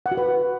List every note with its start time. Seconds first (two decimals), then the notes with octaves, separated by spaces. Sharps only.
0.06 F#5
0.12 F#4
0.17 B4